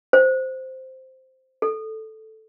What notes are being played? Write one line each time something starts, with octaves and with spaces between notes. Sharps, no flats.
C5
A4